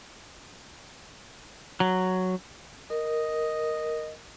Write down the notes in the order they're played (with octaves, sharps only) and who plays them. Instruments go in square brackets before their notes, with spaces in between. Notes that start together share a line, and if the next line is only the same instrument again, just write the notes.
[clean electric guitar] F#3
[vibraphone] A#4 [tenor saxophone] D#5